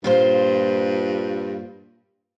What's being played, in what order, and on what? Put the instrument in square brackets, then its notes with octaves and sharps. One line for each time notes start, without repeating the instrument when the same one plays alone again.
[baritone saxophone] G2 [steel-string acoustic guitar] A#2 F4 C5